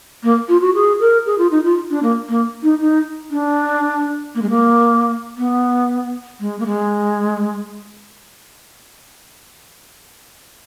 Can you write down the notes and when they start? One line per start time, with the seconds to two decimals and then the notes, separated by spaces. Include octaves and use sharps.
0.23 A#3
0.49 F4
0.62 F#4
0.75 G#4
1.00 A#4
1.26 G#4
1.38 F4
1.51 D#4
1.65 F4
1.90 D4
2.03 A#3
2.29 A#3
2.63 D#4
2.80 D#4
3.31 D4
4.35 A#3
4.42 G#3
4.50 A#3
5.38 B3
6.40 G#3
6.60 A#3
6.66 G#3